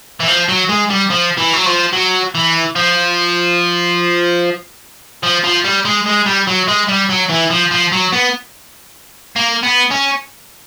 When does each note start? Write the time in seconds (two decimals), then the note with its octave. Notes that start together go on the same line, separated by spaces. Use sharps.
0.20 E3
0.28 F3
0.49 F#3
0.69 G#3
0.90 G3
1.10 F3
1.38 E3
1.54 F#3
1.66 F3
1.93 F#3
2.35 E3
2.76 F3
5.23 F3
5.44 F3
5.65 G3
5.85 G#3
6.06 G#3
6.26 G3
6.47 F#3
6.68 G#3
6.89 G3
7.09 F#3
7.29 E3
7.50 F3
7.71 F3
7.92 F#3
8.12 B3
9.36 A#3
9.63 B3
9.91 C#4